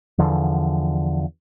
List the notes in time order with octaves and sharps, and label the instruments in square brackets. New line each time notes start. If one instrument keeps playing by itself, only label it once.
[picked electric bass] E2 D3 F3